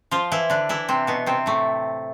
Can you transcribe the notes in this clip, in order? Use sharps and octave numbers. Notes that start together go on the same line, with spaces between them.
F3 F4
E3 E4
D3 D4
E3 E4
C3 C4
B2 B3
C3 C4
A2 A3